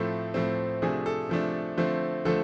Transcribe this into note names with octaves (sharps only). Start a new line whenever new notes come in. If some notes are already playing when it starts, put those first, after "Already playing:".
Already playing: A2 F3 A3 C4 A4
A2 F3 A3 C4
C3 F3 A3 D4 G#4
A4
C3 F3 A3 D4
D3 F3 A3 C4
D3 F3 A3 A4